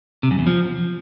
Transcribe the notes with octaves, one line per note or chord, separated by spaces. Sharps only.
C3
F#2
E2
F3